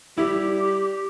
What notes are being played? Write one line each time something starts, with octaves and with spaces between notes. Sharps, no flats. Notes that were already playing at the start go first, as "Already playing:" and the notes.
G3 E4 G4